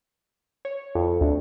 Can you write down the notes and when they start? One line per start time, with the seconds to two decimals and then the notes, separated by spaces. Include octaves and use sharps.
0.65 C#5
0.95 F2
1.21 D2